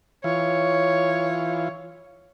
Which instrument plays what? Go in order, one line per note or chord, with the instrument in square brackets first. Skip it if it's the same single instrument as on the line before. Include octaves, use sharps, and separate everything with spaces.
[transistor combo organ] E3 F4 [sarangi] C#5